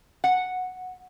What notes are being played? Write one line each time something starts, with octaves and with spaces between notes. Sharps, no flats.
F#5